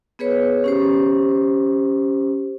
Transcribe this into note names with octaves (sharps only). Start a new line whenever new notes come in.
B3 G#4 B4 C#5
C#4 G4 C5